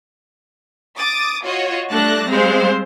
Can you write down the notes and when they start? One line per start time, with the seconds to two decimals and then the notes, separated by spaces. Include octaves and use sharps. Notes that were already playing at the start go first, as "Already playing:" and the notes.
0.98 D6 D#6 A6
1.44 F4 F#4 C#5 D#5
1.90 G3 A3 D4 A5 F#6 A#6
2.29 G3 G#3 C4 C5 F5